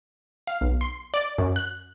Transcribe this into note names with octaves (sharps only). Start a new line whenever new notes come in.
F5
B1
C6
D5
F#2
F#6